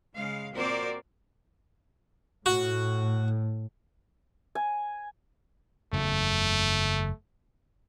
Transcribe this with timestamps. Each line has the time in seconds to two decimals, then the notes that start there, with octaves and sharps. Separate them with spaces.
0.15 C#3 G#3 F5
0.55 A#2 C4 F#4 A#4 C5 D5
2.46 A2 F#4
4.55 G#5
5.93 F#1 E2 C#3 A3